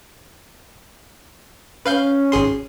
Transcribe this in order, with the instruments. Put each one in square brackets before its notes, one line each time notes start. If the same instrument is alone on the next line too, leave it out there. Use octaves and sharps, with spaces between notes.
[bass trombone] C#4 [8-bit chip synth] B4 F5 G6
[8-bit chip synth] G#1 G#4 C6